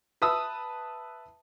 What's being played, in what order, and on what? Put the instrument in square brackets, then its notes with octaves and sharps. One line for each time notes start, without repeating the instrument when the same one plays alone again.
[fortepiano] B4 E5 A5 D#6 E6